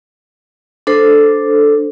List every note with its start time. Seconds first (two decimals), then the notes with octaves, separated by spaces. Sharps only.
0.87 D4 A4 C5